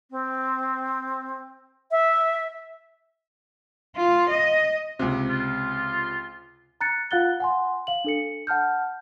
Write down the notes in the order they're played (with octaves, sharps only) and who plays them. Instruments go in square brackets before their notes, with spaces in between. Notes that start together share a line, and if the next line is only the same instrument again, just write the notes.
[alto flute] C4
E5
[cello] F4
D#5
[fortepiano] C#2 C3
[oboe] F4
[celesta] A#5 F#6 A6 C#7
F4 F5 F#5 F#6 A6 G7
F#5 G#5 C6
F5 F#7
D4 A4 C#7
F#5 A5 F6 G6